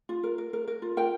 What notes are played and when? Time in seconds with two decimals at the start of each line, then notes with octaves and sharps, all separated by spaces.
0.09 F4
0.23 A#4
0.38 A#4
0.53 A#4
0.68 A#4
0.82 F4
0.97 A#4 G5